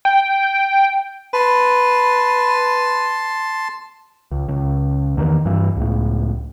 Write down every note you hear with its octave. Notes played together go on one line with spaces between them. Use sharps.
G5
B4 A5 C6
C#2
C#2
E2 D#3
G2 E3
C#2 A2